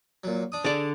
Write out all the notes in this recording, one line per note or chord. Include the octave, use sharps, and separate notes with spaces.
A#2 F#3
D4 D#6
D3 G#4 D5